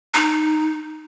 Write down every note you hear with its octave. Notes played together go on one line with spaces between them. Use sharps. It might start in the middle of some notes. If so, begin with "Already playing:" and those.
D#4